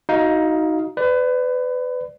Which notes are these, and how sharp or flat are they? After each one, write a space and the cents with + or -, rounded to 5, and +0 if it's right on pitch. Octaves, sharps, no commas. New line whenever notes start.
D#4 +15 F#4 +0 F5 +0
B4 +30 D5 +0